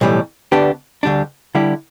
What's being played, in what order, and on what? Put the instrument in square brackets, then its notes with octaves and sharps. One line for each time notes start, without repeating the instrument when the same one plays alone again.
[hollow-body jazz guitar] B1 A2 E3 G3
D2 D3 B3 D4 G4
D2 D3 G3 D4
D3 G3 E4 G4